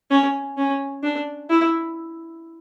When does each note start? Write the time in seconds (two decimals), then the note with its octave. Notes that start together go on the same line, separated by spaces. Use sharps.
0.10 C#4
0.57 C#4
1.03 D4
1.50 E4